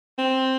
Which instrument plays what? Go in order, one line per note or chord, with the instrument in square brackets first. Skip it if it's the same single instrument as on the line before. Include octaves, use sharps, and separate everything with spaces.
[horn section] C4